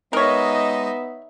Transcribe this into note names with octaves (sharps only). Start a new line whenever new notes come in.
G#3 B3 D#4 A#4 C#5 D#5 E5